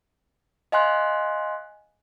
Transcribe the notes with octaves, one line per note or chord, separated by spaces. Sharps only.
D#5 F5 G#5 C6 F#6